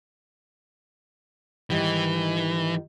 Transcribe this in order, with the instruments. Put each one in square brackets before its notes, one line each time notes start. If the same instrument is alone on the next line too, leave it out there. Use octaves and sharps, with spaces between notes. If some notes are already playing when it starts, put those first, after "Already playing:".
[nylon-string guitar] G#2 D#3 G3 [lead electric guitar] E3